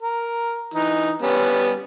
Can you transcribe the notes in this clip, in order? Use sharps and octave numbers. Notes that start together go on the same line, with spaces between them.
A#4
E3 D#4
G3 B3 C#4